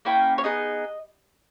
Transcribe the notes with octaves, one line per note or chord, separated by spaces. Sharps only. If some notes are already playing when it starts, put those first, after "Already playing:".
A#3 C#4 E4 G5
C#5
B3 D#4 G#4 D#5